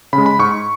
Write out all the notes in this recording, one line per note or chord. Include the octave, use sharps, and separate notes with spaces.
C#3 B5
G#3
B5
G#2 C#6